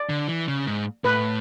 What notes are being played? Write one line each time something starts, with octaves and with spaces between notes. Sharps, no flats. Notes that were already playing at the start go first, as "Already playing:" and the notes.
Already playing: D5
D3
E3
C#3
G#2
A2 B4